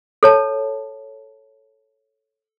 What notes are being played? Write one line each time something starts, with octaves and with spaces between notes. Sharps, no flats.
A4 C#5 A5